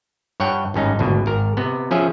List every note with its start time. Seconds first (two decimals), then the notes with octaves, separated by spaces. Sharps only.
0.40 G2 C#5 F#5 G5
0.74 G#1 G2 C#4 D#4
0.99 G#1 D2 B2
1.26 G#1 A#4
1.57 C3 B3
1.91 F3 C#4 G#4 E5